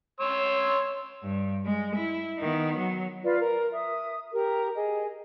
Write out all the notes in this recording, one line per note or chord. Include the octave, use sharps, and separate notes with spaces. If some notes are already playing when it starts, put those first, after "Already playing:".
C#5 C6 E6
G2
G#3
E4
D#3 B3
F#3
F4 B4 D5 F5
A#4
E5 D#6
G4 A#4
G#4 D#5